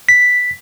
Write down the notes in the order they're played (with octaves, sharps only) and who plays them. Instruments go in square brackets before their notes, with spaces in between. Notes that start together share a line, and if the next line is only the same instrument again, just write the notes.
[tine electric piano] B6